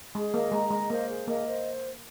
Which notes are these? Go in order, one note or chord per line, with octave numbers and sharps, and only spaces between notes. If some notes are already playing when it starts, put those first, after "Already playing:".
G#3 G#4
A#3 D#5
G#3 A#5
G#3 D#5
A#3 C5
G#4
A#3 D#5
C5